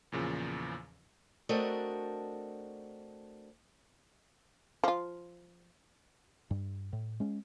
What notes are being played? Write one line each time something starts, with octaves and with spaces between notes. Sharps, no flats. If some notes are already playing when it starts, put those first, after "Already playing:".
E2 A#2 C#3 F3
A3 C4 D4 F#4 A#4 D#5
F3 F4
G2
A2
G#3 C#4